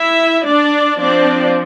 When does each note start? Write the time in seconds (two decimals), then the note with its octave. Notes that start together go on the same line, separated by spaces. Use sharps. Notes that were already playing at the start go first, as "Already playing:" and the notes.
Already playing: E4 E5
0.46 D4 D5
1.00 F3 C4 D4 D5